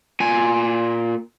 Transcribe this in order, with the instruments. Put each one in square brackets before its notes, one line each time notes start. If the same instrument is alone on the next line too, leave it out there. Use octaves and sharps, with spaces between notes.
[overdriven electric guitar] A#2 G#5